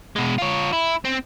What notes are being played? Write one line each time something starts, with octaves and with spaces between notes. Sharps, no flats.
B2 G#3
F4 C#5
E4
C4